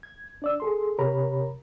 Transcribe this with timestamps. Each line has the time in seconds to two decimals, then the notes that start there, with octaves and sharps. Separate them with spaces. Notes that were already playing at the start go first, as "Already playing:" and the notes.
0.03 G#6
0.42 D4 D5 E6
0.60 G#4 A4 C6
0.99 C3 G4 A#4 C#5 A#5 B5